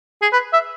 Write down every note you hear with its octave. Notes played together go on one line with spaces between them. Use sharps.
G#4
B4
E5